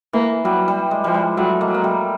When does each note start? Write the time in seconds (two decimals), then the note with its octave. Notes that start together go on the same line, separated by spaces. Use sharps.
0.13 E3 A#3
0.45 F#3 G3
0.68 G3
0.91 G#3
1.04 F3 G3
1.14 G#3
1.37 F#3 G3 A3
1.61 G#3 A#3
1.68 F#3
1.74 A#3
1.84 G3 A3